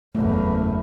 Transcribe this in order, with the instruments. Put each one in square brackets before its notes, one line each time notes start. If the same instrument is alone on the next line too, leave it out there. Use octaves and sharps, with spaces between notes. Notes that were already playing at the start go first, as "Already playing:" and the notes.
[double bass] F#1 E2 [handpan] A3